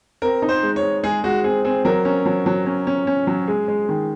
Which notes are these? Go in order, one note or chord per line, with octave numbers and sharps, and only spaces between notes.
C4 A#4
D#4
C5
G#3
C#5
G#3
G#3 G#4
G#3 F#4
C4 G#4
C4 G#4
F#3 A#4
C#4
F#3
F#3
C#4
C#4
C#4
F#3
G#3 G#4
G#3
D#3